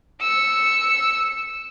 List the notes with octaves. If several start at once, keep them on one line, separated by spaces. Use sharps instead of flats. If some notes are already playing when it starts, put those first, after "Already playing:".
E6 C#7